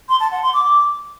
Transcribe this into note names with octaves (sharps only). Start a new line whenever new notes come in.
C6
A5
F#5
C6
D6